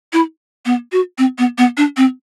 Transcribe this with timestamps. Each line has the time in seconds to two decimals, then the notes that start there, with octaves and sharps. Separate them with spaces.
0.13 E4
0.66 B3
0.92 F#4
1.18 C4
1.38 B3
1.58 B3
1.77 D4
1.97 C4